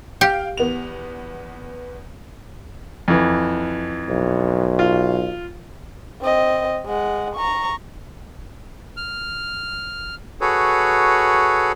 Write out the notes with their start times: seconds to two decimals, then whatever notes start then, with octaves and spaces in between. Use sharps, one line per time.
0.21 G4 F5 G5
0.57 E2 B3 F7
3.08 F2 E3
4.09 B1
4.79 F4
6.21 C4 D#5
6.86 G#3 F#5
7.36 A#5 C#6
8.97 F6
10.41 F#4 G#4 A4 B4 C#5